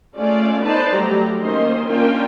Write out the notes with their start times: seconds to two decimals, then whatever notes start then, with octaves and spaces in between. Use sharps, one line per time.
0.15 G#3 A3 C#4 F4 D5
0.61 B3 D#4 B4 C5 D5 A5
0.92 F#3 G3 A3 G4 A#5
1.41 D#3 A#3 C#4 C5 D#5 C6
1.87 A#3 C#4 D4 F4 A#4 G5